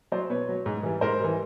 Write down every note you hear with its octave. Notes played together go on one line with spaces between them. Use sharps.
F#3 C5 D5
B2 B4 C#5
F#3
G#2
E3 G3
G#2 A#4 C5
E3 G3